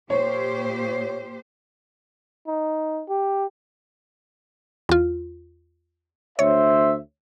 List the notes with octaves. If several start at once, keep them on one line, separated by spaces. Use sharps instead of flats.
A#2 G4 C5 C#5
D#4
G4
E2 F4
D2 C5 C#5 E5